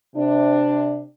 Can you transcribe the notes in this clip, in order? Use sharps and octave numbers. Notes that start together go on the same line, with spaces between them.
C3 D4